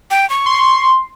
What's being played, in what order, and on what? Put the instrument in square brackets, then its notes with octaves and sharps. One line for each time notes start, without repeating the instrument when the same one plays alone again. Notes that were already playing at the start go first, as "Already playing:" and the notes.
[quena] G5
C#6
[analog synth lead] C6